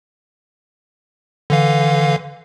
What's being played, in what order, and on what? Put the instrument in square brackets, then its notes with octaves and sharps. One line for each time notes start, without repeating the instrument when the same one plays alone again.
[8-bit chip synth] D3 E3 F5